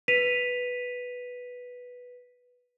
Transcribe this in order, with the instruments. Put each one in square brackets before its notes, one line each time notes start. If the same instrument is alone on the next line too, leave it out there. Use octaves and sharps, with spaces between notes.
[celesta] B4 B6 D#7 F7